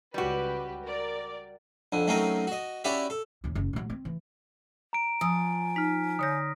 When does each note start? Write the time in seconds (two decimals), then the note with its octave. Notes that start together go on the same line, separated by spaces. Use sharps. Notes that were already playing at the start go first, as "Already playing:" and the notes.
0.14 C#2 G3 F#4 G4 B4
0.83 A#4 D5
1.92 F2 D3
2.07 F#3 A3 C4 C#4 D#4 A#4
2.47 F#4 D#5
2.84 C#4 E4 F#4 G4 D5 E5
3.10 A4
3.44 D#2 A#2
3.55 F#1
3.73 A#2 F#3
3.90 C4
4.05 E3
4.93 A#5 D7
5.21 F3 G#5 D#6 E6
5.76 D#4 F6 B6
6.19 D3 C#5 D#6 G6 A#6